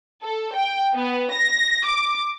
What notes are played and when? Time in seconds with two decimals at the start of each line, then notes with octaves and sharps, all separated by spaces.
0.22 A4
0.55 G5
0.94 B3
1.32 A#6
1.85 D6